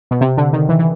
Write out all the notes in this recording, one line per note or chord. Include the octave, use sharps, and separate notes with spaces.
B2
C3
D3
D#3
E3
E3